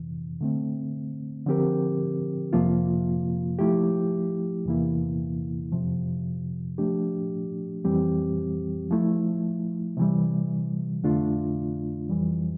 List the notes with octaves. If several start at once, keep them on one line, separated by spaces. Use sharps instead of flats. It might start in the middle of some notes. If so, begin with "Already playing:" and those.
Already playing: F2 C3 E3
D3 A3 C4
D3 F3 C4 G4 A#4
F2 C3 F3 A#3 F4
F3 A3 E4 G4
E2 C3 E3 A#3 E4
F2 C3 F3
F3 A3 D4 G4
F2 E3 G3 C4 G4
F3 A3 E4
C3 E3 G3
F2 D3 A3 D4 F4
F2 E3 G3